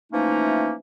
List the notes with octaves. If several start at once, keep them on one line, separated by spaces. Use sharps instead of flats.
E3 F3 A3 A#3 C#4 D#4